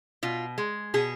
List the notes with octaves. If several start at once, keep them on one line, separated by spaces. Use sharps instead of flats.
B2 F4
G#3
B2 G#4